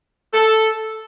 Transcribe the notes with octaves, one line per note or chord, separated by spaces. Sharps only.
A4